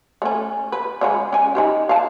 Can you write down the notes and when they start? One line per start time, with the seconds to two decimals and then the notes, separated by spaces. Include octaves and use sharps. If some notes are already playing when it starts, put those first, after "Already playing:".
0.22 A3 C#4
0.72 B4
1.01 C#3 G#3 C#4
1.32 C#4 G#5
1.55 D#4 E4 G4
1.89 F5 A5